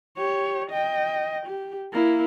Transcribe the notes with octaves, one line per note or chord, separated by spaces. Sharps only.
G4 C#5
D#5 G5
G4
A#3 E4